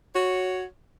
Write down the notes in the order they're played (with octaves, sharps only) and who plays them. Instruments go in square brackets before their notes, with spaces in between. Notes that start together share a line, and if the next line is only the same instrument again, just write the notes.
[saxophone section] F#4 C#5